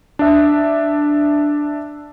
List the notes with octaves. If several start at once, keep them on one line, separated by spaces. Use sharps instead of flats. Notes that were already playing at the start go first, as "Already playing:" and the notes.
D4 E5